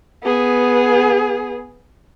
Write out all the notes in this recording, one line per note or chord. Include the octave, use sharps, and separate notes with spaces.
B3 G#4